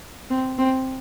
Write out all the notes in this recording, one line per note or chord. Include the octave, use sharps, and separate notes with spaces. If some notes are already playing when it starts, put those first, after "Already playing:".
C4
C4